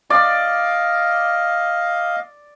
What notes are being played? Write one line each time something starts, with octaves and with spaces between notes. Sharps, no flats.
D5 D#5 F5